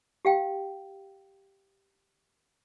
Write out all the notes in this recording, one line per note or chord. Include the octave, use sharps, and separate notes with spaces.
G4 F5 G5